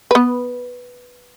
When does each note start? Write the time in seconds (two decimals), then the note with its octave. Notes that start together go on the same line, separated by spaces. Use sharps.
0.11 B3 B4